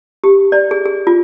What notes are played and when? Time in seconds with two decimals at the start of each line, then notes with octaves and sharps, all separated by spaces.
0.24 G4
0.52 D5
0.71 G#4
0.86 G#4
1.07 F4